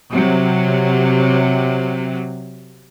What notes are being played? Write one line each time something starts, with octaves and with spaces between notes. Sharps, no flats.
C3 F#3